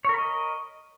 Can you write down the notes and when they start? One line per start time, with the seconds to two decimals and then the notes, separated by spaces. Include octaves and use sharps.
0.05 C#5
0.09 A#4
0.14 B5
0.18 D#5